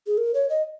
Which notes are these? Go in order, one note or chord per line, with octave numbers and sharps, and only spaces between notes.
G#4
A#4
C#5
D#5